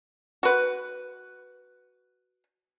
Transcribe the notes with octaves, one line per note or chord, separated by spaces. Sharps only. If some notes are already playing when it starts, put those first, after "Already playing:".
F#4 B4